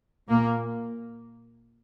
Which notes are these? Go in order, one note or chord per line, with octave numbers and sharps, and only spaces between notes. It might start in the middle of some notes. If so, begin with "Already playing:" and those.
A#2 A#3